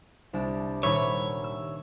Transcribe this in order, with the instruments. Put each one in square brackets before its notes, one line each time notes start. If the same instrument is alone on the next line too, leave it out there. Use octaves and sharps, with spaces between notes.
[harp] C2 D4
[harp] D#1 B5 E6 [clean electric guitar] C#5
[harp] E6